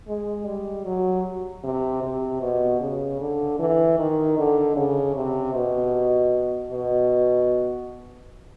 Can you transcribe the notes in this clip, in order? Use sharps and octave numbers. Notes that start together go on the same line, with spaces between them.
G#3
G3
F#3
C3
C3
B2
C#3
D3
E3
D#3
D3
C#3
C3
B2
B2